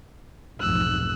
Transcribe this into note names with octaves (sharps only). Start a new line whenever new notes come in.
F1 B1 G#2 E6 F#6